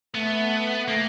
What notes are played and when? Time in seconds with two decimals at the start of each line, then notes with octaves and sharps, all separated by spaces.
0.14 A3 B3
0.88 A#3